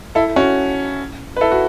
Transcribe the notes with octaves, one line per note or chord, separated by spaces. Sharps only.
E4 A4
C#4 F#4
B4
E4 A4
F#4